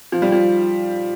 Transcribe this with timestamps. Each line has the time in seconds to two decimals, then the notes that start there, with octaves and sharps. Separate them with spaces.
0.12 F3
0.22 G3
0.32 F3